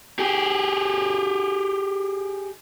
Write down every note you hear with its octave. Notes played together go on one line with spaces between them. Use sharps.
G4 G#4